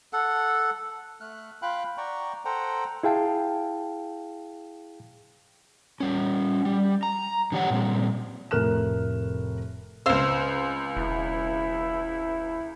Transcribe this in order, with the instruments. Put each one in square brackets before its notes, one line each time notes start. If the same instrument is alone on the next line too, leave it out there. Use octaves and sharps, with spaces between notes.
[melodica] A4 F#5
[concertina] A3 F6 F#6
F4 F5 G5 B5 F#6
D5 F#5 G5 A#5 C#6
A4 C5 F#5 G5 A#5
[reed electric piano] E4 G#4 F5 G5 A5
[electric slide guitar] G3 C#4
G3
A#5
D3 E3 G4 C#5 F#5
A#2 G3 C4
[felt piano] F1 A2 A#4 F6 F#6 E7
[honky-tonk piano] C#2 E6 [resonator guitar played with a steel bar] C4 C5 F5
[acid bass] E1 [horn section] E4